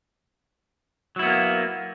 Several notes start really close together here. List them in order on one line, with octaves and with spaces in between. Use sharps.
F#3 E4 B3 A#3